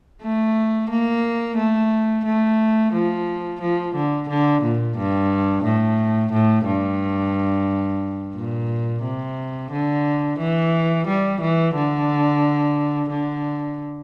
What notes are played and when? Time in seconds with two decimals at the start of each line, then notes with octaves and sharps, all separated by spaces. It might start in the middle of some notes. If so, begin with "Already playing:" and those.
0.23 A3
0.90 A#3
1.58 A3
2.25 A3
2.93 F3
3.61 F3
3.95 D3
4.29 D3
4.63 A#2
4.97 G2
5.64 A2
6.33 A2
6.66 G2
8.35 A#2
9.04 C3
9.72 D3
10.39 E3
11.07 G3
11.41 E3
11.74 D3
13.10 D3